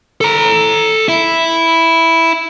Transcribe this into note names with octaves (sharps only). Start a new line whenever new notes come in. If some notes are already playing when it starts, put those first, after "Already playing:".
A4 A#5
E4